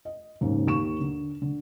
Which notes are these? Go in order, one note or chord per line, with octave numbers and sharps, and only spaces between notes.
D#5
D#2 G#2 C#3
D#2 C#6 E7
D3
D3